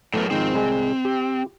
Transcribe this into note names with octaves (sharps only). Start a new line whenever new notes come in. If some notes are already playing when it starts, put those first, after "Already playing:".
A2 F#3 A3 B3 A#4
G#2 D#3 F3 C4
C2 G#3 G#5
G4